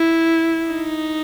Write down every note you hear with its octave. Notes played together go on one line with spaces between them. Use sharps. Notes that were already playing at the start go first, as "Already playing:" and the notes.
Already playing: E4
D#4